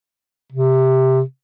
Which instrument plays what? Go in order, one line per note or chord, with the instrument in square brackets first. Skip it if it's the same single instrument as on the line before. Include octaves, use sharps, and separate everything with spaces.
[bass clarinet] C3